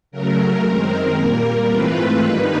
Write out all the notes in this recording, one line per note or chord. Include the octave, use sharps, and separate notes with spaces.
C#3 F#3 A3 A#4
F#2 D#3 G#3 C4
A#2 G3 A#3
G#2 E3 A3 C4 F4 B4
G2 D#3 G3 A#3 D#4